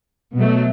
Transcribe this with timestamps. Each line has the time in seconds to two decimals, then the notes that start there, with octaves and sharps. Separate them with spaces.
0.36 B2 F#3 A3